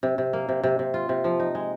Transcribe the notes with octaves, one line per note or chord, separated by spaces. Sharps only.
C3
C3
A#3
C3
C3
C3
F4
C3
F3
D#4
G#3